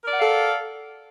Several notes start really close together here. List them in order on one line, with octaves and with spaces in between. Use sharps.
A#4 D5 F#5 F5 A4